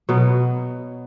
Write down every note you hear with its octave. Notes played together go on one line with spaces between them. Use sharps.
B2 F#3 B3